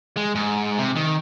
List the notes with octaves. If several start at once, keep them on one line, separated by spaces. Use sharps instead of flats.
G#3
G#2
C3
D#3